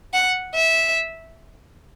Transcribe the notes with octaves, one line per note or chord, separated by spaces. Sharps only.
F#5
E5